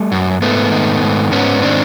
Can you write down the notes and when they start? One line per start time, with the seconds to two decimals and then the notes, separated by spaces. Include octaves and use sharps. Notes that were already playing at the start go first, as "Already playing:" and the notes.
Already playing: G3 A3
0.12 F#2
0.42 G#2 A3 B3
0.71 D#3
1.02 G#2
1.32 G#2 B3 C#4
1.62 D#3 C4 D4